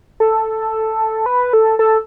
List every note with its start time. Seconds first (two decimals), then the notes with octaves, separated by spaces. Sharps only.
0.20 A4
1.26 B4
1.53 A4
1.79 A4